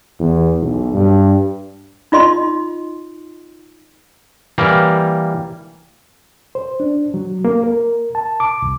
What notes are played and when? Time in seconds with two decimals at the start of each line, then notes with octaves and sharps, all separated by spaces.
0.20 E2
0.62 B1
0.93 G2
2.12 D#4 F4 D#5 C6
4.58 E3 G3 A#3 F5
6.55 C5
6.80 D4
7.14 F#3
7.45 A#3
7.64 A#4
8.15 A5
8.40 D6
8.62 C2